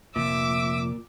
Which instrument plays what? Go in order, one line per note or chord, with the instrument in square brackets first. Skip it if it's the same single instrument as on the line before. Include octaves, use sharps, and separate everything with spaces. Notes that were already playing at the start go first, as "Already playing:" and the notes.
[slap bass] F1 F2 F3 [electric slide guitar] A#2 [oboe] E5 [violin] D6 E6